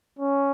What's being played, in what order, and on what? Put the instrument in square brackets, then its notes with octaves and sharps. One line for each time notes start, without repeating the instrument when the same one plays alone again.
[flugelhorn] C#4